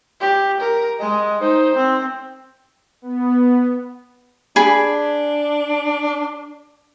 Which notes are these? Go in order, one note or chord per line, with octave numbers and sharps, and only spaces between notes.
G4
A#4
G#3 D#5
D#4 C5
C4
B3
D4 G#4 B5